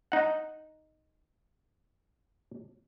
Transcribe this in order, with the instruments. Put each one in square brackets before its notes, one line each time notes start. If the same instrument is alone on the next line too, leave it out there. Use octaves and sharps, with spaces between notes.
[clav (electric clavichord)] D#4 F#5